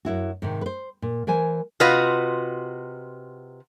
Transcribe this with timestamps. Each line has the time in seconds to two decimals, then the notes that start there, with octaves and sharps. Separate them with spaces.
0.05 F#2 E4 F#4
0.42 G#2 C3 D#3
0.61 B4 C5
1.02 A#2
1.27 E3 A#4 C5 G#5
1.80 C3 F4 F#4 B4 D#5